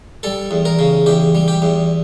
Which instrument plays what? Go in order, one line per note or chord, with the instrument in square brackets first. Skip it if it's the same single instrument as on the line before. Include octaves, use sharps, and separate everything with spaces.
[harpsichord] G3 A4
E2
A#4
C#3
E2 G4
G3
G4
E2